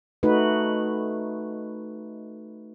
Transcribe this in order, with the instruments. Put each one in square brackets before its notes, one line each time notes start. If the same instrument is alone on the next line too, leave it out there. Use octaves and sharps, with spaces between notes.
[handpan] A3 D#4 F#4 B4